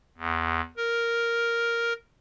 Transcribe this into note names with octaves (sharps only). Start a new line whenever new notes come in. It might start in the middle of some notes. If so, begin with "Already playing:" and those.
E2
A#4